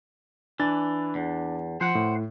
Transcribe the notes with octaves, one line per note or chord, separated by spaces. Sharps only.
E3 D4 A6
E2
F3 C5 F#5
A2